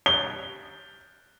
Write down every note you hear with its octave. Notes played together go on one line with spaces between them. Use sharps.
G7